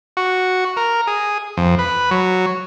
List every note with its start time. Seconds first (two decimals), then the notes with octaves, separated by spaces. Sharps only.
0.17 F#4
0.77 A#4
1.07 G#4
1.57 F2
1.79 B4
2.11 F#3